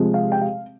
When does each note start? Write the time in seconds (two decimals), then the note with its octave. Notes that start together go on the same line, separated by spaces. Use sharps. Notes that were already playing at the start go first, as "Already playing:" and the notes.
Already playing: C3 F3 G#3
0.14 F5
0.32 G5
0.41 F5